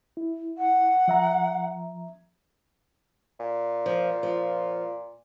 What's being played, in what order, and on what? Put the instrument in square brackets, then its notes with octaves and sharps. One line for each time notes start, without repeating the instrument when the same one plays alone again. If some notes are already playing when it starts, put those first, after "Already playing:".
[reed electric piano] E4
[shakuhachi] F#5
[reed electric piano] F3 E5 A#5
[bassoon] A#2
[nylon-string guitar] F3
F3